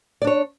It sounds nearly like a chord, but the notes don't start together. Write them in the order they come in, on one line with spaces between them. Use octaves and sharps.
D5 D4 C#5